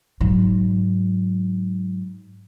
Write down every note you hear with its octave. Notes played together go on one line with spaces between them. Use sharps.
G#2 F#3